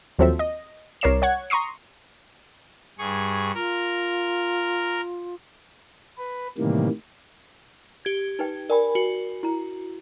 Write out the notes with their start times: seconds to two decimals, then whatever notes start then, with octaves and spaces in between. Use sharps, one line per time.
0.19 D#2 F3 F#3 C4 A4 E5
0.39 D#5
1.01 C2 A#4 C#5 D5 C7 E7
1.22 C#5 F#5 G#6
1.50 A#5 C6 C#6 D#6 C7
2.98 G2 G#4 C#6
3.54 F4 A#4
6.18 B4
6.58 A2 C3 D#3 E3 G3 A#3
8.05 G4 G#6
8.39 D#4 B4 G5
8.70 A#4 D5 G5 G#5 B5
8.95 F#4
9.43 E4 A#5